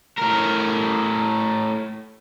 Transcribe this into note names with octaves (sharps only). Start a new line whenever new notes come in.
A2 A#4